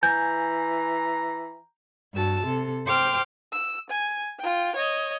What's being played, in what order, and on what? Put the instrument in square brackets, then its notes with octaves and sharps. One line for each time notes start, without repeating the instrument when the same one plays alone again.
[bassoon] E3 [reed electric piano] G#5 [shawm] A#5 [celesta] G6
[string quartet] G2 F#4 A5 E6
C3 A4
C5 G5 D6 F6
[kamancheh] E6
G#5
F4 G5
C#5 D#5